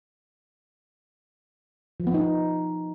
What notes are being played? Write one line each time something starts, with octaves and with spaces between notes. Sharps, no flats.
F3
B3
D#4